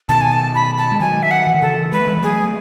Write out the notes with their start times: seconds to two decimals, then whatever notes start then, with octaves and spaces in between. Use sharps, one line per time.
0.09 B2 D#3 A5
0.21 G#5
0.32 A5
0.55 B5
0.78 A5
0.92 G#3
1.00 D#3 F#3 G#5
1.23 E5
1.31 F#5
1.47 E3
1.55 D#3
1.61 C#3 E3 A4
1.92 G#3 B4
2.00 A3
2.07 E3 G#3
2.17 G#3
2.23 F#3 A3 G#4
2.44 A3